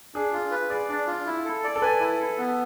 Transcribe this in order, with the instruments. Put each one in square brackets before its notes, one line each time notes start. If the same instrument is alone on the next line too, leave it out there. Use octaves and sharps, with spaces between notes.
[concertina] D4 [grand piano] G#4
[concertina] F4
B4
[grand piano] G#4 [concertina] D5
[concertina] D4
F4
E4
A4
D5
[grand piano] A4
[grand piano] B4 [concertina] G#5
[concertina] E4
A4
B3